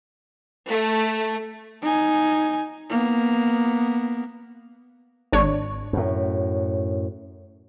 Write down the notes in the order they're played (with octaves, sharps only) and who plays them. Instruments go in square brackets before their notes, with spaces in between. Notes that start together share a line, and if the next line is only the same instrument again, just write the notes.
[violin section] A3
[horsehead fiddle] D#4 G#5
A#3 B3
[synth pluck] G#1 D4 C#5
[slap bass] F#2 A2